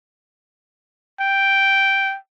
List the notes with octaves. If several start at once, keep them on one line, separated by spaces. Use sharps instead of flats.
G5